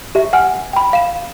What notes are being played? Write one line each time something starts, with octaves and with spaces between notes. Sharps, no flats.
G4 E5
F#5 G#5 F6
G5 B5
F5 E7